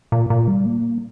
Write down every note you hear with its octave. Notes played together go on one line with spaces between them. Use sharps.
A#2
A#2
G3
A#3